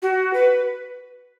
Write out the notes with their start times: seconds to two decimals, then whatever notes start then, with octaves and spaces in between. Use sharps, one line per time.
0.02 F#4
0.34 B4